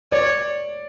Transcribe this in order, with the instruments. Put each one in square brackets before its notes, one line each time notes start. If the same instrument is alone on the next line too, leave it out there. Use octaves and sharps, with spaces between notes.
[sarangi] C#5 [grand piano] D5